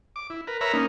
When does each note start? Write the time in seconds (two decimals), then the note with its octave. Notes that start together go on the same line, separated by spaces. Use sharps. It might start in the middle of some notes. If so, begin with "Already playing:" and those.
0.16 D6
0.30 E4
0.47 A#4 B4
0.61 A#4 B4 C#5 E5 A#5 B5
0.74 A#3 C#4 D#4